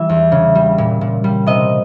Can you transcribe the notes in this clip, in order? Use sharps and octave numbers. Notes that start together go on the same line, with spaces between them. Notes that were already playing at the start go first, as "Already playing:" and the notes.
Already playing: E3 G3 E5
E2
C#3
G3
A#2
A#2
G3
C3 D#5